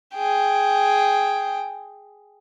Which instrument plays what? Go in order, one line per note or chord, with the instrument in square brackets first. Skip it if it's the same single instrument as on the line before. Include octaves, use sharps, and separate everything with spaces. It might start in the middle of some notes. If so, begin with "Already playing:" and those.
[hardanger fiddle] G#4 G5